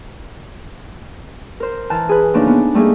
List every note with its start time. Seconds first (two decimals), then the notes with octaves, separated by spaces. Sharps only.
1.60 A#4 C5
1.90 E3 A5 A#5 F6 G6
2.09 G#4 B4
2.34 C#3 F3 A3 A#3 D4 D#4
2.47 B3
2.74 G3 A3 A#3 D#4 G#4